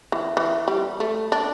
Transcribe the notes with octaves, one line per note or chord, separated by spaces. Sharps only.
E3
E3
G3
A3
D4